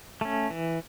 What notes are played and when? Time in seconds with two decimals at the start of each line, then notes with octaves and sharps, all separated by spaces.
0.21 A3 C#4
0.50 E3